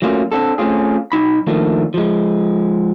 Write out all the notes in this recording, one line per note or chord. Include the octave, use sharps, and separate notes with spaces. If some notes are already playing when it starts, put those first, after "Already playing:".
F#3 A3 A#3 C#4 F4
C4 D4 A4
A3 C4 C#4 F4 G#4
B1 D#4 B5
D#3 F3 A3 A#3 D4
F3 G#3